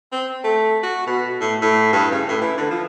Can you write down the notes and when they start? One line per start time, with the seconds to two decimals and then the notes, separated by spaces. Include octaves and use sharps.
0.12 C4
0.44 A3
0.83 F#4
1.07 B2
1.41 A2
1.61 A2
1.93 G2
2.11 C#3
2.28 A2
2.41 E3
2.58 D3
2.70 F3